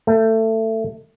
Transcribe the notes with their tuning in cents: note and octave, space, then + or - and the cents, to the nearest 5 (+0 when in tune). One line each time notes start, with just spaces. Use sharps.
A3 +20